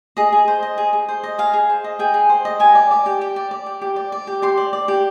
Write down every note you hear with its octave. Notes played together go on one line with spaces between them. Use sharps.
G#4 D#5
G#4
C5
D#5
G#4
G#4
C5
D#5
G#4 F5
G#4
C5
D#5
G#4 G5
G#4
C5
D#5
G4 G#5
D5
D5
G4
G4
D5
D5
G4
G4
D5
D5
G4
G4 C6
D5
D5
G4